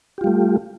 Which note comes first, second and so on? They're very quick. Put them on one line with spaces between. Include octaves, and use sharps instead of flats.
G4 F4 G3 A3